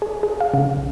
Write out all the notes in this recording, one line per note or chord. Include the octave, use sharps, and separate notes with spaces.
G#4
G#4
F5
C#3
B1